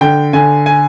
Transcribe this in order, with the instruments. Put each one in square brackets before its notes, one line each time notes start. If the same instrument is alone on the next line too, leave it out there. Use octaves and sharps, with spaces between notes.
[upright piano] D3 G5
D3 G#5
G#5